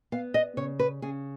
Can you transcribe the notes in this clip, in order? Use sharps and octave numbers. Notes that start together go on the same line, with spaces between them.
B3 F5
D#5
C#3 C#5
B4
C#3 G#4